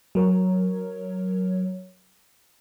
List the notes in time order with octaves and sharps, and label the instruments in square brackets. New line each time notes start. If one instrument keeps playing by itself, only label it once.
[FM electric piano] F#3 A#4 C#5